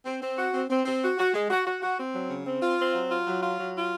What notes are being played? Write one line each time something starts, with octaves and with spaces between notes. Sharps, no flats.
C4
C4
F#4
C4
C4
C4
F#4
F#4
G#3
F#4
F#4
F#4
C4
F#3
C#3
C4
F4
C4
F#3
F4
F#3
F4
F#3
F4